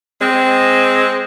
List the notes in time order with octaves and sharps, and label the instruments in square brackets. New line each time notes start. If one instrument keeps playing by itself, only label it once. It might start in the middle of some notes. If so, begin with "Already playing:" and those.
[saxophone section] G#3 C4